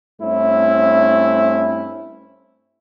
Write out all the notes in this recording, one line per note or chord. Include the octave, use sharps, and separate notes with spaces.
G2 A3 C4 C#4 E4